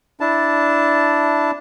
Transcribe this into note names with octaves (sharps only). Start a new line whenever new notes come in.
D4 E4 A5